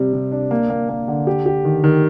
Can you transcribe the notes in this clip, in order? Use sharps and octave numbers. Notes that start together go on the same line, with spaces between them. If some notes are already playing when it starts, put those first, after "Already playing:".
Already playing: C3 G3
C3
D4
A#3
A#3
A#3
D3
G4
G4
D#3
D#3